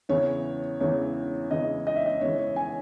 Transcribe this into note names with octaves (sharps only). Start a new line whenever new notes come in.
E2 C#3 E3 C#5
E2 C#3 E3 C#5
E2 C#3 E3 D#5
D#5
E5
D#5
E2 C#3 E3 C#5
C#5
G#5